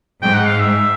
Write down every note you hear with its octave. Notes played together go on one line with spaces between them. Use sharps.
G#2 G5
F#5
F5
E5